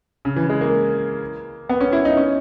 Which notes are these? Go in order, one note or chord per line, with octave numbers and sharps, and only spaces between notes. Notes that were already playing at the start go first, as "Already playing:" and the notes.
C#3
E3
G#3
A#3
B3
C#4
E4
D#4
C#4